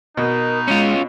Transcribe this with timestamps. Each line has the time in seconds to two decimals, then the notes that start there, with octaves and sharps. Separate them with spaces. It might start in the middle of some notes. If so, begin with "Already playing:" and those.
0.17 B2 D#4 A#4
0.68 G#3 C#4 F4